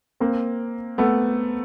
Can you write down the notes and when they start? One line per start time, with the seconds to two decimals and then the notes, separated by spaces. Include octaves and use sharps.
0.20 A#3 C4
0.98 A3 B3